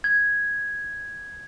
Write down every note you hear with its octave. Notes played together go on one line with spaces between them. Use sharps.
G#6